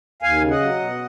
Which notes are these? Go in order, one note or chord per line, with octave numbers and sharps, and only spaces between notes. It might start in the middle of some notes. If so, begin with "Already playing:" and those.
D#2 F5 G#5
C#3
D#5 F#5
F#3
B2